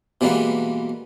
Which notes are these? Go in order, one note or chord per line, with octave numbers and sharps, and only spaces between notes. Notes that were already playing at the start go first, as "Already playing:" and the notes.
B2 E3 G3 G#3 A#3 B3